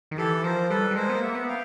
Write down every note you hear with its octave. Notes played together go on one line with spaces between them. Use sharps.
D#3
E3 G4 A4
F3 A#4 C5
G3 A4 B4
G3
G#3 A#4 C5
B3
A#3
E5 F#5
B3
F5 G5